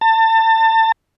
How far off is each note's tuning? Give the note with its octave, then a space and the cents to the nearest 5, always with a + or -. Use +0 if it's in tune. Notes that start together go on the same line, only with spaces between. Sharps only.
A5 +30